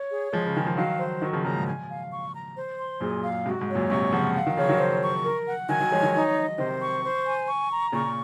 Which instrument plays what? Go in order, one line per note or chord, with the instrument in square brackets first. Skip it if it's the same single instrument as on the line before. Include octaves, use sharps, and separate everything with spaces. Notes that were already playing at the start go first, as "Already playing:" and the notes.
Already playing: [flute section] C#5
G#4
[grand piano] F3 G#3 [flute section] G#4
[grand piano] C#3
[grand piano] D#3 [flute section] G#5
[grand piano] F3
[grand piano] D#3 F#3 [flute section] F5
[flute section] C5
[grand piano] D#3 F#3 [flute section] C#6
[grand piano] C#3 F3
[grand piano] A#2 C#3 [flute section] A#5
[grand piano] G#2
[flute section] G#5
F5
C#6
A#5
C5
C6
[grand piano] F#2 A#2 [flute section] G#4
[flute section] F5
[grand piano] G#2 C3 [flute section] F#4
[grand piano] G#2
[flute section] C#5
[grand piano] F#2 A#2
[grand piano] G#2 C3 [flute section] C#6
[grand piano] C#3 F3 [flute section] F#5
[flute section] F5
[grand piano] D#3 F#3
[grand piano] C#3 F3 [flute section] C#5
[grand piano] D#3 F#3
[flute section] C5
C#6
A#4
F#5
[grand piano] D#3 F#3 [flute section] G#5
[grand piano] D#3 F#3
[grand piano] F3 G#3 [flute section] C#5
[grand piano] D#3 F#3
[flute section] D#4
D#5
[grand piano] C3 D#3 [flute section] C5
[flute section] C#6
C5
G#5
C#6
A#5
[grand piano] A#2 C#3 [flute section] C#6